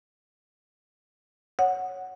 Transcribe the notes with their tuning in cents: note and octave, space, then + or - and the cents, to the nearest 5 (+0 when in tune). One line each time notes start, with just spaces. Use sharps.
C#5 +0 F#5 -5